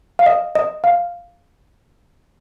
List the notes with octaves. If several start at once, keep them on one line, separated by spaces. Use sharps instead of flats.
F5
D#5
D#5
F5